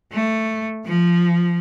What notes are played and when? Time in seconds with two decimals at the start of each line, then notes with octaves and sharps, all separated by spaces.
0.13 A3
0.85 F3